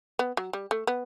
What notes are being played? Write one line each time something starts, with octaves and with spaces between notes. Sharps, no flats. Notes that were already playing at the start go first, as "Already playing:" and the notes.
B3
F#3
G3
A3
B3